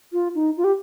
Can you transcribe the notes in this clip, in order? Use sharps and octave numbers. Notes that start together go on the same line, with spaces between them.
F4
D#4
F4
G4